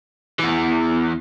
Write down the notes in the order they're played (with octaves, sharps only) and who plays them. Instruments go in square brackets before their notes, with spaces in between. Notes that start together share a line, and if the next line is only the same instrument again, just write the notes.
[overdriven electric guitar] E2 E3